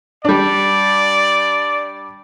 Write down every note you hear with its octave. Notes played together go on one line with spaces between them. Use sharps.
G3 D4 D5